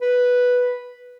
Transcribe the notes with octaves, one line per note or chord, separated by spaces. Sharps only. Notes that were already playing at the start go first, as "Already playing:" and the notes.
B4